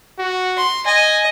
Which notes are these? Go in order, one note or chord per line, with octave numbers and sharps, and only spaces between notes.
F#4
C6
D#5 G#5